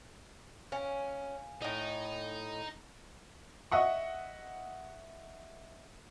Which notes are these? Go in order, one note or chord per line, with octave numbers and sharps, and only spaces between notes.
C#4 F5 G#5
A2 D#4 D#5
D#5 E5 F#5 C#6